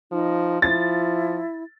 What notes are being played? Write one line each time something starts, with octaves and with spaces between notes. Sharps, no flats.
F3 D#4
F3 E4 A6